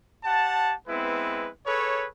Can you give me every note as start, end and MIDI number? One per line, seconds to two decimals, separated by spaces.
0.24 0.74 67
0.24 0.74 78
0.24 0.74 81
0.87 1.48 56
0.87 1.48 59
0.87 1.48 60
0.87 1.48 64
0.87 1.48 71
1.66 2.05 68
1.66 2.05 69
1.66 2.05 71
1.66 2.05 73